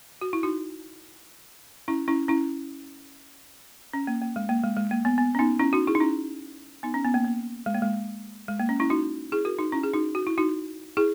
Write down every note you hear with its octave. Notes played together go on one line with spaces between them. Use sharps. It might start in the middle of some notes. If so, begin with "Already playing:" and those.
F#4
E4
D#4 F#4
C#4 E4
C#4 E4
C#4 E4
C#4
A#3
A#3
G#3
A#3
G#3
G#3
A#3
B3
B3
C#4
B3 D#4
C#4 E4
D#4 F#4
E4 G#4
D#4
C#4 E4
B3 D#4
C#4
B3
A#3
A#3
G#3
A#3
G#3
G#3
A#3
C#4
C#4 E4
D#4 F#4
E4 G#4
F#4 A#4
D#4 F#4
C#4 E4
G#4
D#4 F#4
F#4
E4
D#4 F#4
E4 G#4